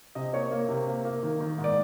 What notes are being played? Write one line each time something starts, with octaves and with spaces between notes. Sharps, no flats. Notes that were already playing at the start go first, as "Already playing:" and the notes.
C3 D#5
A#3 C#5
A#3
C3
A#3
A#3
D#3
D#3
G#2
D5